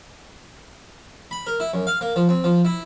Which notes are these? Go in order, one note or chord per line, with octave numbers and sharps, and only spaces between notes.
B5
A#4
E4
F#2
F5
A#3
F3
C4
F3
E4